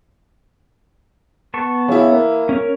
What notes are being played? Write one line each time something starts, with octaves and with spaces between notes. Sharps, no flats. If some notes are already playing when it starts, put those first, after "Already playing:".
B3 A5 C#6
C#3 E3 E4
A#3
C#4 A#4 C#5